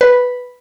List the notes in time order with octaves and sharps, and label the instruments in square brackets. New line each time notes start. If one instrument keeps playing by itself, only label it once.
[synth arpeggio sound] B4